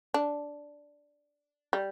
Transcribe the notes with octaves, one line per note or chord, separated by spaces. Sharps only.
D4
G3